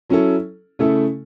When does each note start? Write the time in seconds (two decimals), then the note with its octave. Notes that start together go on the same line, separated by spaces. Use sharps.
0.10 F#3 C#4 E4 A4
0.79 C#3 A3 E4 A4